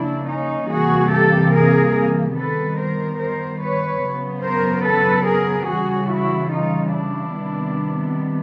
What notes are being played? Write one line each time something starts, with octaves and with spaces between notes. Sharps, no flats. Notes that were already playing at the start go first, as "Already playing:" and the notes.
Already playing: C#3 F3 A#3 D4 E4
C#4 D#4
C3 E3 G3 A#3 F#4 G#4
G4 A4
G#4 A#4
D#3 G3 B3 A4 B4
A#4 C5
A#4 C5
B4 C#5
C#3 F#3 B3
A#4 C5
A4 B4
G#4 A#4
C#3 E3 G3 F#4 G#4
E4 F#4
D#4 F4
D4 E4
C3 D#3 G3 B3